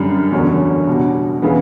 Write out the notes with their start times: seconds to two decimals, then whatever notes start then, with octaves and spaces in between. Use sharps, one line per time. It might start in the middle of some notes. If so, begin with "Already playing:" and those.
Already playing: F#2 D3 G3
0.32 F#1 E2 D3 F#3 C#4
0.88 B2 G3 D4 F#4
1.42 C#3 E3 B3